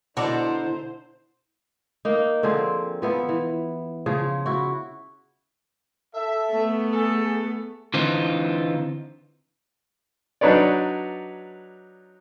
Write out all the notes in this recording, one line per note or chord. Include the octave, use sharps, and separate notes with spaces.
B2 D3 E4 F#4 A4 C5 D5 A#5
A#3 D#4
D3 F3 C4 G#4
F3 B3 E4
E3
C#3 F3 G#4
E4 F#4
A4 E5
A3 B3
G#4 A4
D3 E3 C4 D#4 F4
F#3 D4 D#4 B4 C#5 D5